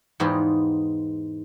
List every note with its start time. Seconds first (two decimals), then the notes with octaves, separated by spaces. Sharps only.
0.20 E2 G#2 B3 D#4 F4 G4